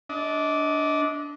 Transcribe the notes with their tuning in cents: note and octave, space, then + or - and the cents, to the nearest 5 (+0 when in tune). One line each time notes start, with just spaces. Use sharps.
D4 -10 D#5 +30